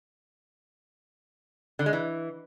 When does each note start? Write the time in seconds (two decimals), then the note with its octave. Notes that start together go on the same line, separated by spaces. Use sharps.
1.79 D3
1.86 G#3
1.93 E3